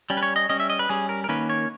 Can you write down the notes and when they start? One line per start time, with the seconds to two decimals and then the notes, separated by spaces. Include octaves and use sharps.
0.10 G3 C#4
0.17 B4
0.23 C#5
0.36 D#5
0.49 G3 C#4 D#5
0.60 E5
0.70 D#5
0.79 B4
0.89 G3 C#4 G#4
1.09 A#4
1.24 A#4
1.29 D#3 A#3 C#4 B4
1.50 C#5